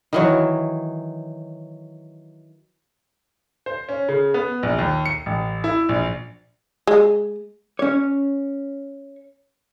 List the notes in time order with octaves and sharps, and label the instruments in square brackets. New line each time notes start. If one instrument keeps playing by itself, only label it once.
[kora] D#3 E3 F#3
[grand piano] C5
C#4
C#3
B3
A#1
D#2
C#7
A1
E4
A#1
[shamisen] G#3
[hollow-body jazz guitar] C#4 C#5